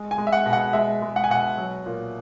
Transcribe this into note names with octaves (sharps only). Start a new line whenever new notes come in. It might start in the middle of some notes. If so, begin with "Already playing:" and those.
Already playing: G#3
G#5
G#3
E5
F#5
B2
F#5
G#3 E5
G#3
F#5
G#5
B2 F#5
F#3
A#2